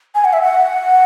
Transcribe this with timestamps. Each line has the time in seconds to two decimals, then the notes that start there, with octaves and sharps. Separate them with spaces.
0.15 G#5
0.25 F#5
0.33 E5
0.42 F#5